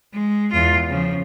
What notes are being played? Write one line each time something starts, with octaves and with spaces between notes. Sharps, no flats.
G#3
E2 F4
C#3 F3